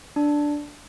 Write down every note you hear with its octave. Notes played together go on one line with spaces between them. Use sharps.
D4